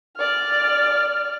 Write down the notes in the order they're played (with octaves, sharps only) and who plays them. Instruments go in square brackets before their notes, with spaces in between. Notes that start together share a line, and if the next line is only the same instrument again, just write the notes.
[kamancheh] D5 F6